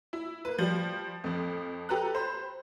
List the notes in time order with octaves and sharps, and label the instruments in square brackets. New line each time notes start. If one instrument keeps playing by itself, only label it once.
[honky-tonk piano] E4
A#3 B4
F3 G3
F2 F3
G4 A4 B4 A#5 F#6
C5 B5